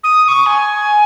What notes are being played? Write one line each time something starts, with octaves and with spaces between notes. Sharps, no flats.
D#6
D#6
C#6
G#5